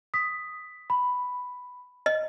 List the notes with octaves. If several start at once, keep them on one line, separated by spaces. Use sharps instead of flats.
D#6 B6
B5
D#5